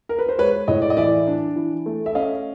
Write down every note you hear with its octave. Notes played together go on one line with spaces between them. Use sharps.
A#4
B4
C5
G#3 B4 C#5
A2 C#5 D#5
D5
D#5
E3 D5 E5
D4
E3
A3
E5
C#4 D#5 F5